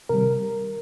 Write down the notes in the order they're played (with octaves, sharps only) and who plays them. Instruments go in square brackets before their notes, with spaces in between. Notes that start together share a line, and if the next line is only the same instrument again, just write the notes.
[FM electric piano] C3 D#3 G3 A#4